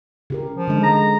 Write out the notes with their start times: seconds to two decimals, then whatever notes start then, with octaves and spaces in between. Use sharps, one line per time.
0.30 C#3 G4 A#4
0.55 F3
0.68 D3 G#3
0.83 A#5